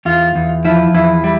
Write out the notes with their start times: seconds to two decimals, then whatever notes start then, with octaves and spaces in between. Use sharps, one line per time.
0.05 E2 F4
0.35 E2
0.65 F3 E4
0.94 E2 E4
1.24 G3